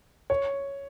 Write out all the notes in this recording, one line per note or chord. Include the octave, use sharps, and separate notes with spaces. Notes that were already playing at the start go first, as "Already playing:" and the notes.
C#5